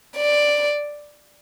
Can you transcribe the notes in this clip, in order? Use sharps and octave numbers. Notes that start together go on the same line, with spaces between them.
D5